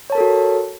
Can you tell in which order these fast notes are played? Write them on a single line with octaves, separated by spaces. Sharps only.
C#5 A5 A#4 A4 F#4